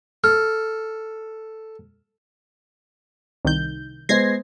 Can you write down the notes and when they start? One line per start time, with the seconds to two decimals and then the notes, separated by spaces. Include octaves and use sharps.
0.24 A4 F6
3.45 C2 D#3 G6
4.09 G#3 B3 C5 G#6 A#6 C7